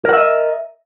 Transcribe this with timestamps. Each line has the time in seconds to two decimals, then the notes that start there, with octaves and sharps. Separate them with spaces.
0.05 A#4
0.09 F#5
0.13 E5
0.17 D#5